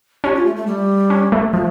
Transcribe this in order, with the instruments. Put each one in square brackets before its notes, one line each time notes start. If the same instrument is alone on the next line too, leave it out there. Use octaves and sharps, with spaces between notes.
[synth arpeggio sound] C#4 [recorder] G4
[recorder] F4
A3
A3
G3
[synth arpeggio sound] C#4
A3
[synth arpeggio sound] F3 [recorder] A3